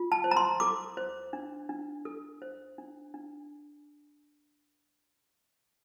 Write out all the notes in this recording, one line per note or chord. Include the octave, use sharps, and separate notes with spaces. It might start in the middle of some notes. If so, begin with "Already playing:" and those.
Already playing: F4
A5
C5
A#5
C6
A4 D6
C5
D4
D4
A4
C5
D4
D4